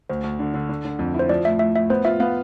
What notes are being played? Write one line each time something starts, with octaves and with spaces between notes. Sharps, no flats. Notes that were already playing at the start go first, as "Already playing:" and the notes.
D2 C5
D2
D3
D3
D3
D3
F2
E4
C5
F3 D5
A2 E5
A2 E5
A2 E5
B3 C5
F4 E5
B3 F5